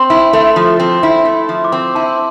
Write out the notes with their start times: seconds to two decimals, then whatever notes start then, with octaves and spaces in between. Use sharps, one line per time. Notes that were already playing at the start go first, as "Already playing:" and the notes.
Already playing: C4 C6
0.10 E4
0.33 A3
0.56 F3
0.80 C4
1.03 E4
1.25 A3
1.49 F3
1.65 D6
1.72 C4 C6
1.95 E4 A5